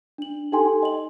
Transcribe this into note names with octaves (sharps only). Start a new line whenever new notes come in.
D4 F#7
D#4 G4 A4 G5 G#5 C6
D#5 F#7